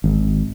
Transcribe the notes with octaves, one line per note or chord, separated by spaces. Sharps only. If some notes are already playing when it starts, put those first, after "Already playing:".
G#1